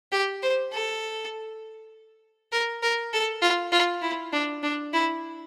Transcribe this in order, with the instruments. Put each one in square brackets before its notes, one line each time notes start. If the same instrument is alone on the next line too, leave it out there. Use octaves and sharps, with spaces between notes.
[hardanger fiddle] G4
C5
A4
A#4
A#4
A4
F4
F4
E4
D4
D4
E4